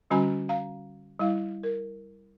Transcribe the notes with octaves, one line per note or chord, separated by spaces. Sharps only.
D3 G3 C#4 F#4 G#5 A#5
F5 A#5
G3 E4 F5
A#4